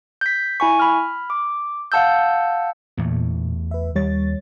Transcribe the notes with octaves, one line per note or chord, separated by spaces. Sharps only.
G6 B6
E4 G#5 C#6
B5 F6
D6
F5 F#5 A5 E6 G6
E2 A#2 E3 A3
B4 E5
D#2 G3 C#5 A6